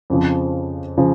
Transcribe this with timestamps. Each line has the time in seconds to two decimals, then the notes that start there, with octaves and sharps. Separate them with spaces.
0.10 F2 C#3 F3
0.98 C#3 F3